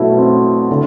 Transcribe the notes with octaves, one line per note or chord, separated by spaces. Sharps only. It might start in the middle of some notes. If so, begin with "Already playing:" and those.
Already playing: B2 F#3 A3 E4 F#4
C4
D3